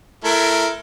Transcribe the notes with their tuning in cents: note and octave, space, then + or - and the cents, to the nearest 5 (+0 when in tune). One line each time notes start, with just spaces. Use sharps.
A3 +0 E4 +25 A#4 +0